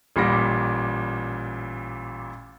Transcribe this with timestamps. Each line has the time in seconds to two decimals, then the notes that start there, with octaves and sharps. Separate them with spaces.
0.16 A1 A#2 G3 B5 D6 A#6